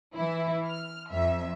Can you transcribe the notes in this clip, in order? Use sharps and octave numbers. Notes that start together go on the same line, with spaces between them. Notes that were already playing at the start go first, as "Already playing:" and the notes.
E3 E4
F6
F2 E5